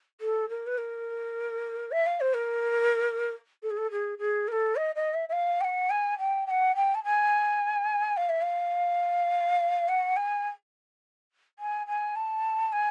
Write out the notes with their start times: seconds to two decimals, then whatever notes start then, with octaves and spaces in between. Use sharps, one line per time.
0.21 A4
0.49 A#4
0.67 B4
0.78 A#4
1.91 E5
2.06 F5
2.20 C5
2.34 A#4
3.63 A4
3.70 G#4
3.77 A4
3.91 G#4
4.19 G#4
4.48 A#4
4.52 A4
4.76 D#5
4.95 D#5
5.14 E5
5.29 E5
5.32 F5
5.61 G5
5.64 F#5
5.90 G#5
6.18 G5
6.47 G5
6.50 F#5
6.75 G5
6.95 A5
7.04 G#5
8.17 F5
8.29 E5
8.42 F5
9.88 F#5
10.16 G#5
11.59 G#5
11.87 G#5
12.15 A5
12.73 G#5